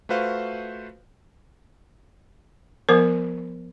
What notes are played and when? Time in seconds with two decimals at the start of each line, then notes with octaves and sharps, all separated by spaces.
0.09 A3 F4 F#4 B4 C5 F5
2.89 F3 B3 A#4 C5 D6